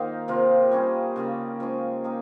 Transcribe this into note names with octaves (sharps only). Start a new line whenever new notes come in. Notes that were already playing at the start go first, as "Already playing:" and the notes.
Already playing: D#3 A#3 D#4 F4 C5
C3 F3 A#3 F4
G3 C#4 G#4 C5
C#3 G3 A#3 C#4
F3 G#3 C#4
A#3 D#4 G4 A#4